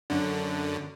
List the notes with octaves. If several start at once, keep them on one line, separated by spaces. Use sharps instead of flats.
F#2 D3